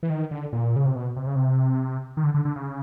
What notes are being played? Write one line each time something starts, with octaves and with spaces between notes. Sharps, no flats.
E3
D#3
D3
A#2
C#3
C3
B2
C3
C#3
C3
D#3
D3
D3
D3
C#3